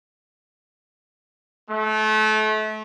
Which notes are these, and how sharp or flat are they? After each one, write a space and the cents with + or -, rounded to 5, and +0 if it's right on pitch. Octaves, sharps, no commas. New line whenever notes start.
A3 -30